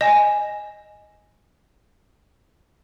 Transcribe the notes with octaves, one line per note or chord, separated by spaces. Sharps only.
D#5 G#5